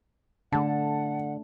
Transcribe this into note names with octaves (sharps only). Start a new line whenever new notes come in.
D3 A3 D4 F#5 A5